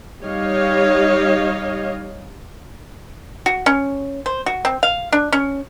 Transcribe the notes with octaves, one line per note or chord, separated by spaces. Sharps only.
G3 D#4 G4 C#5 D#5 F5
F#4
C#4
C5
F#4
C4
F5
D4
C#4